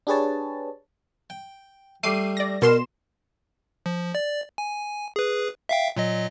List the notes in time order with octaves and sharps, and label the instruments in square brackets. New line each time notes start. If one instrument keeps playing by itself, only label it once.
[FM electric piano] D4 G4 G#4 B4 C#5 A5
[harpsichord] G5
[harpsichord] G3 A3 [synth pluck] D6 C7 D#7
[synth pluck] D5 A#6
[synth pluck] B2 C6 E7 [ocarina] A#4
[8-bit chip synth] F3
D5
G#5
G#4 B4
E5 F5 G5
A#2 F#3 D#5